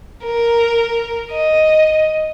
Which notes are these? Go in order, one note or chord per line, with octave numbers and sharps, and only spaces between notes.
A#4
D#5